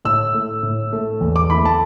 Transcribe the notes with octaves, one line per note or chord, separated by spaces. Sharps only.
A2 E6
A3
A2
A3
E2
D6
E3 A3 B5
A5